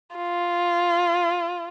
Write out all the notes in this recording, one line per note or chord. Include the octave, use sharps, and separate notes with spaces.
F4